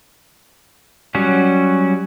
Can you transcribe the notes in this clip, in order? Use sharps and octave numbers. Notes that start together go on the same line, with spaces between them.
F#3 G3 C#4 F#4